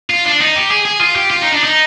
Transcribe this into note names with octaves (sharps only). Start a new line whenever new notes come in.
F4
D4
D#4
G4
G#4
G#4
F4
G4
F4
D#4
D4
D#4